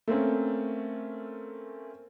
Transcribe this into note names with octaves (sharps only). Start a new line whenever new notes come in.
A3 A#3 C4 C#4